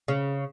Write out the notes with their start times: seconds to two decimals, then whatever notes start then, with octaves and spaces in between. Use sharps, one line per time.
0.08 C#3